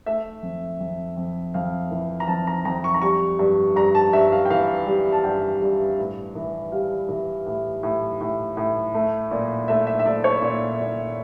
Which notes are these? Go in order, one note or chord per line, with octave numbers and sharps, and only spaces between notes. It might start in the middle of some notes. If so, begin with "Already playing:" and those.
A3 E5
F2
F2
F2
F2 F5
E3
A#5
F2 A5
A#5
F2 A#5
C#6
A#5
G3 C#6
G2
G2 A#5
A5
G2 E5
F5
G5
E3 F5
G3
A5
G2 G5
G2
A2
E3
G3 F5
E3
A2
A2
A2
A2
A3
A#2
A3 E5
E5
E5
A3 D5
C#5
A#2 D5
A#2